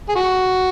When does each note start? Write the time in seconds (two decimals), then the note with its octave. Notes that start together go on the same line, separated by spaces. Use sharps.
0.09 G#4
0.15 F#4